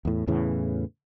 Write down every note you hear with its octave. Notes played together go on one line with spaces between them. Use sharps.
E2 A2
E2 A2 C#3 E3